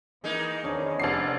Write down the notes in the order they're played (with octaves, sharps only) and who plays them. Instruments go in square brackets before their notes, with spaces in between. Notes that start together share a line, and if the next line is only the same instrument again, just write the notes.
[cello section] E3 [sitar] G#3 A#3 D#4
[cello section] E2 D#3 [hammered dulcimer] C#4 D4 B4
[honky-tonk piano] F1 C7 [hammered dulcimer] B3 D4 [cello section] C#4 C5 D5